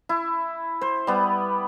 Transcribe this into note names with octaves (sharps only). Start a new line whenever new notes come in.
E4
C5
G3 B3